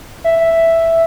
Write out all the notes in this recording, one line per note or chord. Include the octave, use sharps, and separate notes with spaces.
E5